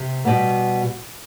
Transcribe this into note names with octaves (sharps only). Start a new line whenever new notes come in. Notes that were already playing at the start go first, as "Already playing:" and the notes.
Already playing: C3
B2 G3 B3